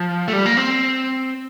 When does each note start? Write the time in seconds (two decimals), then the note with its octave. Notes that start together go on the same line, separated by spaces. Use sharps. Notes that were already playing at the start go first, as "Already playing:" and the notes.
Already playing: F3
0.28 A3
0.33 G3
0.46 A#3
0.57 C4